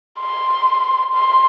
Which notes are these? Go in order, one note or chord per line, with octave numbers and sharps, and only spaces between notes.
C6
C6